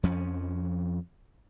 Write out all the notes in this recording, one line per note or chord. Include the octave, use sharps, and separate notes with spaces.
F2 F3 C#4